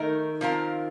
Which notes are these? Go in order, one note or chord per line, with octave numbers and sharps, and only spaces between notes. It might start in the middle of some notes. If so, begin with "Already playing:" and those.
Already playing: D#3 A3 D#4 A#4
F3 C4 F4 A#4